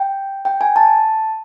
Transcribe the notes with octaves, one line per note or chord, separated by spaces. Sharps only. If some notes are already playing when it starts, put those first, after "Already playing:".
Already playing: G5
G5
G#5
A5